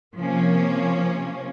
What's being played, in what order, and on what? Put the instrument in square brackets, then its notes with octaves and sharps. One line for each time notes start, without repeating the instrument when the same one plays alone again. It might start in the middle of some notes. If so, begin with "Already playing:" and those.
[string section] C3 F3 A#3 C#4